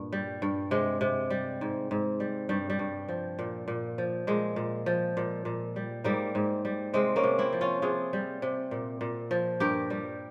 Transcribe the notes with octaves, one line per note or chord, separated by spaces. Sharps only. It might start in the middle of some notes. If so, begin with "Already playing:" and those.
Already playing: G2 A#2
G3
G2
C3 G#3
C3
G3
G#2
G#2
G3
G2 G3
G3
G2
F3
A#2
A#2
F3
A#2 G#3
A#2
F3
A#2
A#2
G3
G#2 G3 A#3
G#2
G3
C3 G#3 C4
A#3 C#4
C3
C4 E4
F3
C#4 F4
C3 F4 G#4
G3
C3
A#2
A#2
F3
G2 G4 A#4
G3